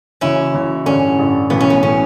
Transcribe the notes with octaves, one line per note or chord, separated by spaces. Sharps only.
F#1 F#2 E3 C#4 E4
F#1 F#2 E3
A1 G2 D3 C#4
A1 G2 D3
B1 A2 E3 B3
C#4
B3
A2 E3 C#4